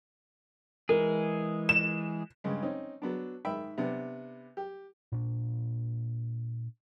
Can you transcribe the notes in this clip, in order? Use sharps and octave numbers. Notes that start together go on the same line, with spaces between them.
E3 G#3 G#4 A#4
E7
G2 C#3 G#3
C4 C#4 D#4
F#3 B3 D4
G#2 D#3 E5 G5 B5
C3 B3 D4
G4
A#2 D4